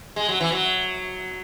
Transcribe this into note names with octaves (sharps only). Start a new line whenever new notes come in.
G#3
F#3
E3
F#3